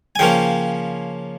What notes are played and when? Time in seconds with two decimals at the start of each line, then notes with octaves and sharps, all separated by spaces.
0.16 G#5
0.19 C#3 F3 A#3 C#4 G5